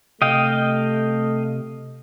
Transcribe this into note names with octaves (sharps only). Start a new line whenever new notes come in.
C3 A3 D#5 F5 G5